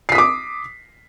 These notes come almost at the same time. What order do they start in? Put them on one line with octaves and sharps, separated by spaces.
C7 B6 D#6 D6